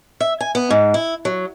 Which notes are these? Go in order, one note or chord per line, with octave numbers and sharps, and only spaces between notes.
E5
G#5
B3
G#2
E4
F#3